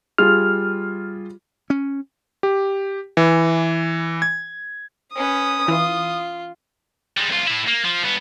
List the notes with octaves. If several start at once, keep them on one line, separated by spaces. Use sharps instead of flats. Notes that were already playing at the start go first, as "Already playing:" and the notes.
G3 F4 G#4 F6
C#4
G4
E3
G#6
C#4 B4 D#6
E3 F4
G3 G#3
C2 F4
A2 E4
A#3
F3
G2 B3